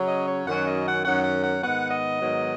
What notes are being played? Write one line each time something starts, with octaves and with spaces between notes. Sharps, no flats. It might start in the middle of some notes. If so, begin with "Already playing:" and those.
Already playing: C#3 F#3 C#4
D#5
C#5
F#2 D#3 F#3 C#4 F#5
D#5
F#5
F#2 D#3 F#3 C#4 F#5
F#5
F#5
G#2 D#3 B3 F#5
D#5
G#2 D#3 F#3 B3